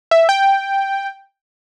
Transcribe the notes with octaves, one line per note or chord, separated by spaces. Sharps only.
E5
G5